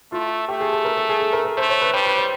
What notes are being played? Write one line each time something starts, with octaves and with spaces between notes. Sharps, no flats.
A3 F4
A3 G4
G#4
A4
A#4
A4
G#4
A4
A#4
A#4
A3 C5
C#5
B4
G3 C5
B4
C5